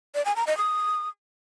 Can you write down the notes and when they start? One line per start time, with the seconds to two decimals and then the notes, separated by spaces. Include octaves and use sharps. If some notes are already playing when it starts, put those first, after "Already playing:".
0.15 D5
0.25 G#5
0.36 A#5
0.47 D#5
0.58 D#6